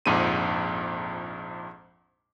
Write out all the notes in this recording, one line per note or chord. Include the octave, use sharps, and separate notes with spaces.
A#1 F2 G#2 C4 D#7